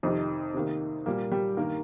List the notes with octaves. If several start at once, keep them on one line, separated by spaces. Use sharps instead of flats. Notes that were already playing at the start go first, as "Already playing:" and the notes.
F2 C3 D#3 D#4
C3 D#3 A#3
A#2 G3 A#3
G3 G4
G2 D#3 A#3 A#4